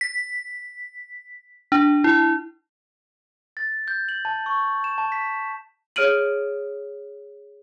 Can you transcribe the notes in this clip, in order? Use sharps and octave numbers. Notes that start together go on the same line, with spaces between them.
B6
D4
E4
A6
G6
F#7
A5
C#6
E7
A5
B6
G#4 C#5 F6 D7 D#7 F#7